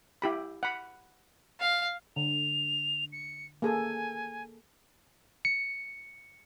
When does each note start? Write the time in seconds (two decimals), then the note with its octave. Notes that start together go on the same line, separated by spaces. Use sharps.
0.22 E4 G4 B5
0.63 F#5 B5
1.60 F5
2.16 D3 F7
3.12 C#7
3.62 A#3 G#4 A4 G#5
5.45 C#7